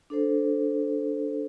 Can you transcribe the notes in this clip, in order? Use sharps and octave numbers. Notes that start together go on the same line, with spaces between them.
D4 A4 C5